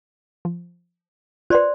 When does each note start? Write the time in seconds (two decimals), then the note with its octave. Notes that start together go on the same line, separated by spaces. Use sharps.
0.45 F3
1.50 F4 B4 C5 D5 C6